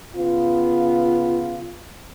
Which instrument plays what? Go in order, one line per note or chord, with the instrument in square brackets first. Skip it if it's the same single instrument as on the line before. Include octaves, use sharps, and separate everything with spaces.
[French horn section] C#3 B3 F4